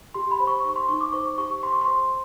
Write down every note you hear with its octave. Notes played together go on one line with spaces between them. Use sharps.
G4 C6
B5
C5
C#6
D#4 C#6
C6
D#4 C#6
D6
C5 C#6
G4 C#6
C5 C6
C#6
C6
C5